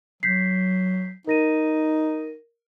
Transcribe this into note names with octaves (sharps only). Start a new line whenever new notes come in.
F#3 G6 B6 C7
D#4 A#4 A#6 D#7